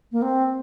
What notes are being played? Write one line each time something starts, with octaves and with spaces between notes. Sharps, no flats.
A#3
C4